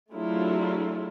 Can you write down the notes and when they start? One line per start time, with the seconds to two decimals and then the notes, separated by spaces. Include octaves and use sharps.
0.12 F#3 A3 D4 E4 F4 G#4